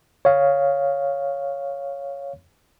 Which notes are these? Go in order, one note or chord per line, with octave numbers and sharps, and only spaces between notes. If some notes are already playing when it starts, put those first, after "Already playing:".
C#5 F5